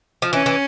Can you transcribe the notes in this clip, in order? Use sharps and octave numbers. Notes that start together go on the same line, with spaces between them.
F3
E3 C#4
E3